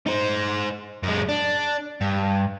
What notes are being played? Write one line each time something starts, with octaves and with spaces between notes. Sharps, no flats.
D#4 C5
F#2 G#3
D4
G2